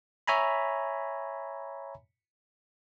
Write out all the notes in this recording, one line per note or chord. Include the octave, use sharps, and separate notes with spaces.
C#5 E5 G#5 A#5 B5